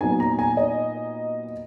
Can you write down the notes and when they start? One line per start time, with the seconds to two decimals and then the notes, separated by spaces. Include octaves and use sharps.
0.01 A#2 F#3 B3 D#4 G#5
0.20 A#5
0.39 G#5
0.57 D#5